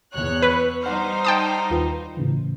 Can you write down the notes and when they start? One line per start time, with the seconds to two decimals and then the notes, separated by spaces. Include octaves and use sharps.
0.13 E2 C#5 F#6
0.42 B4 E6
0.83 G3 D#4 C5 F#5 F6
1.25 G5 A5 D#6
1.70 D#2 F4 B4
2.17 A2 C#3 E3